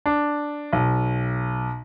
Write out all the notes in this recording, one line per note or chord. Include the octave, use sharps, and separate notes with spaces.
D4
B1